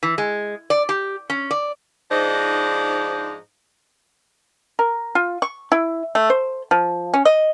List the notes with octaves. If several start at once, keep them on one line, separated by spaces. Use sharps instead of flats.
E3
G#3
D5
G4
C#4
D5
G#2 F3 D4 D#4 C5 D#5
A#4
F4
C#6
E4
A3
C5
F3
C#4
D#5